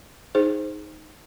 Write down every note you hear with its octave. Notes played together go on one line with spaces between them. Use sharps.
D#4 G#4 C5